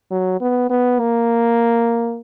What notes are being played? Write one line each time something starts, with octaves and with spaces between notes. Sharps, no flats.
F#3
B3
B3
A#3